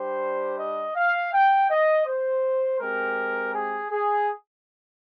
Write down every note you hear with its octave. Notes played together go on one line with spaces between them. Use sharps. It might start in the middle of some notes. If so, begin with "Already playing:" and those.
Already playing: G3 D4 G4 C5
D#5
F5
G5
D#5
C5
G#3 C4 G4 A#4
G#4
G#4